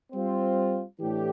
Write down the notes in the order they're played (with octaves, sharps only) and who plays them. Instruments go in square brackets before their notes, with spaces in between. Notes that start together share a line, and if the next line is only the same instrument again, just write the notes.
[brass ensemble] G3 C4 F4 C5
A2 E3 A3 D4 G4